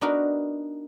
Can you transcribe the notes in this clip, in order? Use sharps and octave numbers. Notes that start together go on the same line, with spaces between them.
B3 D4 D#4 F#4 A#4